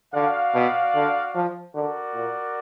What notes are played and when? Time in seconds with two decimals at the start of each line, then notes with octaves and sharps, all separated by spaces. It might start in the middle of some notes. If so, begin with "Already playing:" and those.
0.14 D3 F#4 D5 F5
0.54 B2
0.94 D3
1.35 F3
1.74 D3 F#4 A#4 D5
2.14 A#2